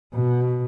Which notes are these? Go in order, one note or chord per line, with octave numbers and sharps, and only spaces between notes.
B2